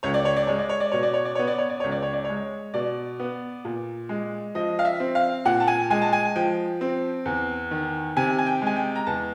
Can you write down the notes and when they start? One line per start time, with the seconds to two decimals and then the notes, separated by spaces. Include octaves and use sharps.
0.03 C#2 C#5
0.14 D5
0.25 C#5
0.36 D5
0.47 G#3 C#5
0.59 D5
0.69 C#5
0.80 D5
0.92 B2 C#5
1.03 D5
1.14 C#5
1.25 D5
1.35 B3 C#5
1.47 D5
1.58 C#5
1.69 D5
1.80 C#2 C#5
1.91 D5
2.02 C#5
2.13 D5
2.25 G#3 C#5
2.74 B2 D5
3.20 B3
3.65 A#2
4.09 G#3
4.55 F3 D#5
4.79 F5
4.85 E5
5.00 C4
5.15 F5
5.45 A#2 F#5
5.60 A5
5.68 G#5
5.90 G#3 G#5
6.02 A5
6.13 G#5
6.36 F3 G5
6.81 C4
7.26 E2
7.71 D#3
8.17 C3 G#5
8.38 G#5
8.46 G5
8.62 G#3 G#5
8.76 G5
8.96 A#5
9.06 E2 A5